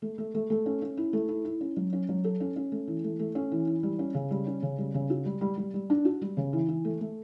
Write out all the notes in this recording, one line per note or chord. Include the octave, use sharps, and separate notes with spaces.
A3
A3
A3
A3
C#4
C#4
E4
A3
E4
E4
C#4
F#3
C#4
F#3
A4
C#4
C#4
A3
E3
A3
A3
C#4
E3
E4
G3
C#4
C#3
G3
C#4
C#3
G3
C#3
F#4
G3
G3
G3
G3
D4
F#4
G3
C#3
E3
E3
A3
A3